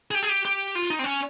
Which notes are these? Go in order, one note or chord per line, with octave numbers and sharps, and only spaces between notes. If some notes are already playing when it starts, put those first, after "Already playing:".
G#4
G4
G#4
G4
G4
F4
D#4
C4
C#4